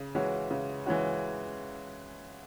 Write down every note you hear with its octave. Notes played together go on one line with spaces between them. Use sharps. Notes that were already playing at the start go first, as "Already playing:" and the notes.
Already playing: C#3
E3 G#3 C#4 F#4
C#3
E3 G#3 C#4 F#4